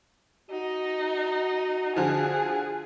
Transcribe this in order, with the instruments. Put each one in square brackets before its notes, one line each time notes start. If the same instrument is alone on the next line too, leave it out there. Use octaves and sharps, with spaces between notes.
[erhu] D#4 [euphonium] F#4
[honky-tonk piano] D3 F3 [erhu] G#4